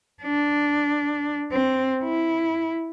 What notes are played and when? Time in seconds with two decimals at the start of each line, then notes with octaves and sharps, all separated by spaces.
0.23 D4
1.52 C4
2.04 E4